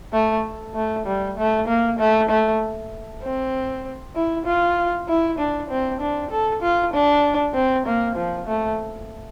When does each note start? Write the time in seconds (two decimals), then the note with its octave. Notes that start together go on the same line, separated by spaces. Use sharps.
0.13 A3
0.75 A3
1.06 G3
1.37 A3
1.67 A#3
1.99 A3
2.29 A3
3.23 C4
4.15 E4
4.45 F4
5.08 E4
5.38 D4
5.70 C4
6.01 D4
6.31 A4
6.62 F4
6.94 D4
7.54 C4
7.86 A#3
8.16 F3
8.47 A3